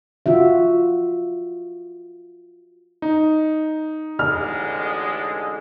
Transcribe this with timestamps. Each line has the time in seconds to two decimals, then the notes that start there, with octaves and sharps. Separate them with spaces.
0.26 F4 F#4 E5
3.02 D#4
4.19 A1 D3 G#3 F6